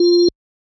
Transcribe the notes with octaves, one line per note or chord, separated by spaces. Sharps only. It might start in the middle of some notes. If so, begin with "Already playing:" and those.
Already playing: F4